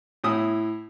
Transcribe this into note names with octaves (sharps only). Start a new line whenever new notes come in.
A2 E4 D#6